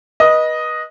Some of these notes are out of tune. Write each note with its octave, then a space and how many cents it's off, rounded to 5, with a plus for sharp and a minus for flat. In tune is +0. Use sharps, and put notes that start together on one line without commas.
B4 -30 D#5 +0